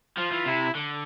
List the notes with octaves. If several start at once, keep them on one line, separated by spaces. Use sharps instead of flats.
F3 F4
E3
C3 E4
D3